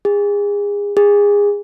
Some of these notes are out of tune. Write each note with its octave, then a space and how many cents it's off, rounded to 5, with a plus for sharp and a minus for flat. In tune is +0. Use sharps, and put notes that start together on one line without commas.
G#4 -30
G#4 -25